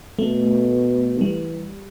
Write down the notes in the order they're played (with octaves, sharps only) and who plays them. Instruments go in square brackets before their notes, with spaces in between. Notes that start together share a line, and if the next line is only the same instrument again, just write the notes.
[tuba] B2 [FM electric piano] A3
[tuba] E3 [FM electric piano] G3